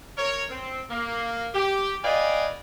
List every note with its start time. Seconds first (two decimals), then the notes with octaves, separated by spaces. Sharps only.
0.17 A#4 C#5
0.50 C4
0.90 A#3
1.54 G4
2.03 B4 D5 D#5 F5 G5 G#5